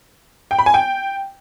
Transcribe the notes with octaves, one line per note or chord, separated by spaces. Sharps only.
G5
B5
G#5
G5